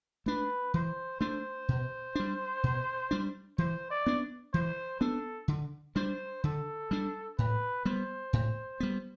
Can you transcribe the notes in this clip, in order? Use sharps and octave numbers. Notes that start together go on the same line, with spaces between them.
A3 D4 B4
E3 C5
A3 D4 C5
B2
G3 D4
B2
G3 D4
E3 C5
D5
B3 D4
E3 C5
B3 D4 A4
D3
G3 D4 C5
D3 A4
G3 D4
A2 B4
G3 B3 C5
A2
G3 B3